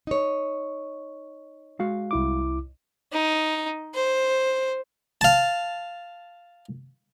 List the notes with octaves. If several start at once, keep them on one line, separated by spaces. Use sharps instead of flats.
D#4 C#5
G#3 F#4 F5
C2 E4 D6
D#4
C5
F5 A5